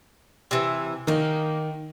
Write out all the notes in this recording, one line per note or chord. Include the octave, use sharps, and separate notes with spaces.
C3 E3
D#3 A#3 D#4